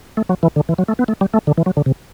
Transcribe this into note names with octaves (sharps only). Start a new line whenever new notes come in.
A3
F#3
E3
D3
E3
F#3
A3
B3
A3
G3
A3
D3
E3
F#3
D3
C3